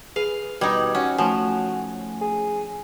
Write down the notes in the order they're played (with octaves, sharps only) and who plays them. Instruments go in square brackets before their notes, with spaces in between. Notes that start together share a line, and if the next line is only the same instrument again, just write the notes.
[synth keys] G#4 B4 [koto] F5
[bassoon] B2 [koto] G3 D#4 [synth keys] G#6
[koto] C#4 [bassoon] F#4
[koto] F3 [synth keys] A3 C#5 G#5 [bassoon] F#4
[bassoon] G#4